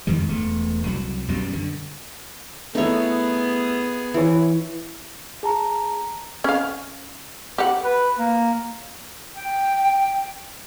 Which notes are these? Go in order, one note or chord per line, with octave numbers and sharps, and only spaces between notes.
F2 G#2 D#3 G3
E1 A3
C2 F#3
B1 F#2 B2 G3
D3
A3 B3 D#4 E4 G#4 C#5
E3 E4 C#5
G#4 A5 A#5
C#4 F5
G4 F#5
B4
A#3
G5